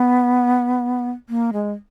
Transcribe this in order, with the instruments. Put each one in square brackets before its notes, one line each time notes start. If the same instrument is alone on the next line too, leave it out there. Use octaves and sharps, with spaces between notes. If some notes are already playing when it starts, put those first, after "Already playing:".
Already playing: [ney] B3
A#3
G#3